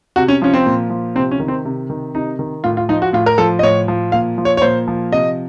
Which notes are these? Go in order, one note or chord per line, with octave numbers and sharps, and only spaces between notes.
C3 F#4
C#4
F3 C#4
C4
A#2
F3
C3 C4
C#4
D#3
C4
C3
D#3
C3 D#4
D#3
A2 F4
F4
F3 D#4
F#4
A2 F4
A#4
F3 A4
D#5
A2 C#5
F3
A#2 F5
F3
C#5
C#5
A#2 C5
F3
C3 D#5